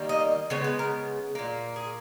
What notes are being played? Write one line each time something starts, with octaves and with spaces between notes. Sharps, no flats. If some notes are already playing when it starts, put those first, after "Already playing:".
Already playing: D#3 G3 A#3
D#5
C#3 G#3 B3 C#5
B4
A#4
A#2 A#3
G#4